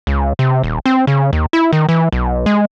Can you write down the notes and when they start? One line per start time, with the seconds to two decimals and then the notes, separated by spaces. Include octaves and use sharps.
0.07 C#2
0.39 C3
0.63 D#1
0.86 C4
1.07 C#3
1.33 D#2
1.53 E4
1.73 D#3
1.89 E3
2.12 B1
2.46 G#3